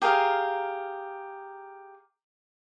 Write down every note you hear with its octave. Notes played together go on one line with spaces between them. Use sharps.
G4 G#4 A#4 F5